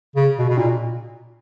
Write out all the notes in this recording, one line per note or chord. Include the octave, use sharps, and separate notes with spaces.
C#3
B2
B2
A#2